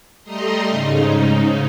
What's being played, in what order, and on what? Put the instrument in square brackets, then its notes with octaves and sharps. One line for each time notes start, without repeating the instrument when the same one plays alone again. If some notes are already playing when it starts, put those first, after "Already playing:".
[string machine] G3 A3 D#5 A#5 C6
G#2 C#3 D#4